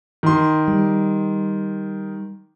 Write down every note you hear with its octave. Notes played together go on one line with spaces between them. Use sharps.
D#3 C6
G3